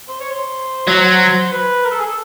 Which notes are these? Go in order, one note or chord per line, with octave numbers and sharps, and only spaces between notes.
C5
C#5
C5
F#3
B4
A#4
A4
G#4
A4